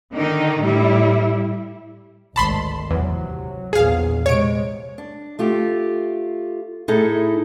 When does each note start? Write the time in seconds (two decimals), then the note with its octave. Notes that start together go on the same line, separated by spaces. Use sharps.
0.14 D3 D#3 D#4
0.61 A2 G3 E4
2.36 G#1 D2 A5 B5 C6
2.91 E2 C3 F#3
3.73 A#1 E2 G#4 F5
4.26 C3 G#3 C#5 D7
4.98 D4
5.39 A3 F4 G4
6.88 A2 D#4 E4 G#4 A4